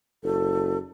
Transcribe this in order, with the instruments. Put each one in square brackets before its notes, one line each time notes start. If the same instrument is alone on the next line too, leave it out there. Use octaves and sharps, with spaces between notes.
[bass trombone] F#1 [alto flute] A4